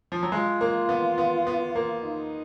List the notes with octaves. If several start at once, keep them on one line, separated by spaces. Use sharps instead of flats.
F3
F#3
G#3 F4
A#3
B3
B3
B3
A#3
D#4